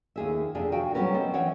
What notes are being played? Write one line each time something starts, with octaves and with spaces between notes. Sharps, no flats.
D#2 G#4 E5
F2 C3 D4 G#4
F#4 F5 G5 G#5
F#3 G3 B3 C#4 A#4 B4
B3 C4 D#5
E3 C4 C#4 C#5 F#5 G5